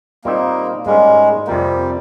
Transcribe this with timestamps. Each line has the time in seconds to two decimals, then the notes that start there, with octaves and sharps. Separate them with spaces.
0.24 A#2 G3 A#3 C4 D#4
0.86 G#2 G3 G#3 A#3 C#4
1.47 F2 C3 F3 G3 A#3